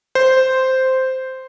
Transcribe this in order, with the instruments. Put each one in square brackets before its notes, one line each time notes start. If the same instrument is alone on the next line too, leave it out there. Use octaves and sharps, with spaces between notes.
[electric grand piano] C5